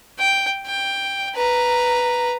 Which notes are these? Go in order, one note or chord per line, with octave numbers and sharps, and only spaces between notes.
G5
G5
B4 A#5